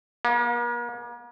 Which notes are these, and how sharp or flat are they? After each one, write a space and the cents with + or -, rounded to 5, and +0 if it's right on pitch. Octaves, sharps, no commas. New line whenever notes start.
A#3 +45